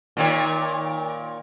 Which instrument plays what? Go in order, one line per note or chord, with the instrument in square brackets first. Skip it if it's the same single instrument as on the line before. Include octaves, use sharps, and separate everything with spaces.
[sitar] A#2 D#3 C#5